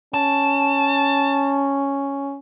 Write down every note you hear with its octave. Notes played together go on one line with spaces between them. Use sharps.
C#4 A5